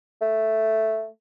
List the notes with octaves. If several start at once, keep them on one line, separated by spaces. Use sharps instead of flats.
A3